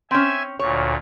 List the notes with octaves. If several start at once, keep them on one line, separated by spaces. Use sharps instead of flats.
C4 C#4 E5 G#5 E6
D2 A#2 C#5